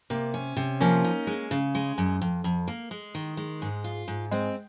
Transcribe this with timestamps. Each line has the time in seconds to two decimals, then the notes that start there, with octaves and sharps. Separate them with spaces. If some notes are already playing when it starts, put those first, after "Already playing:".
0.10 C3 A#3
0.34 C#4
0.57 C3
0.80 F3 A#3 C#4
1.05 D#4
1.27 G#3
1.51 C#3
1.75 G#3
1.98 F#2
2.22 F2
2.44 F2
2.68 A#3
2.91 G#3
3.15 D#3
3.37 G#3
3.62 G#2
3.84 F4
4.08 G#2
4.31 G#3 C4